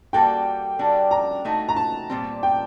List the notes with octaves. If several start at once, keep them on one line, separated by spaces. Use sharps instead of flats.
G3 A#3 F#4 A4 G5
G3 D4 F#4
A#5
A3 D#4 F#4
A#5
A5
A#2 G3 C4
G5